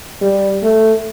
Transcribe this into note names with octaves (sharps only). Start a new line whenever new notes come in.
G3
A3